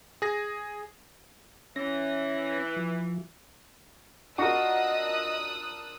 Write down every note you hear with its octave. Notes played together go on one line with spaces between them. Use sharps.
G#4 A#6
E3 C#4 A#6
F3
D4 F4 F#4 A#4 D#5 D#6 E6 F#6